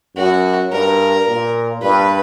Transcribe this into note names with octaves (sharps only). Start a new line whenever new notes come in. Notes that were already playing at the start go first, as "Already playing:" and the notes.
F#2 F#4
G2 A#4
A#2
G2 B4